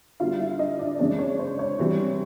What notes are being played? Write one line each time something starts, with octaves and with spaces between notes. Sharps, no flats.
D3 G3 B3 F4 F5
E4 E5
D#4 D#5
D4 D5
F2 C#3 E3 G#3 C#4 D4 D5
C#5
C5
C#5
C3 E3 G3 C4